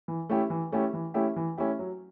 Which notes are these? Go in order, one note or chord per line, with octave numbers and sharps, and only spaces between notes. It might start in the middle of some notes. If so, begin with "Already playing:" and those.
E3
A3 C#4 E4 G4
E3
A3 C#4 E4 G4
E3
A3 C#4 E4 G4
E3
A3 C#4 E4 G4
F#3